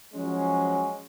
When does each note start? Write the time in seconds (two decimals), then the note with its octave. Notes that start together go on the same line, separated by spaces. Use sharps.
0.14 F3 F#3 G#3 C#4